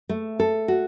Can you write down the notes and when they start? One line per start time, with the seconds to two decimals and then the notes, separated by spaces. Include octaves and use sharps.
0.09 A3
0.40 A4
0.68 F#4